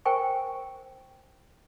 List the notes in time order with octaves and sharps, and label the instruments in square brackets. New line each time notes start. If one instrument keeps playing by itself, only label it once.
[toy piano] A#4 C5 G5 G#5 C#6